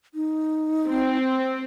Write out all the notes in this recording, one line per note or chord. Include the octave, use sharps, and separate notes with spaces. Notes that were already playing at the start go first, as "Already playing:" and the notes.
D#4
C4